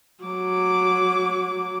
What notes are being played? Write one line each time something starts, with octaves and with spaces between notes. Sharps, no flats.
F#3 D6